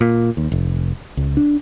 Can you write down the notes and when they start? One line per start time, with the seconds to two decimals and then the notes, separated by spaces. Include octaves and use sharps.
0.01 A#2
0.37 D#2
0.52 F1
1.17 C#2
1.37 D4